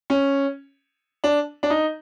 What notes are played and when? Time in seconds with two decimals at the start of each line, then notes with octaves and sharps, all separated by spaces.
0.10 C#4
1.24 D4
1.63 D4
1.70 D#4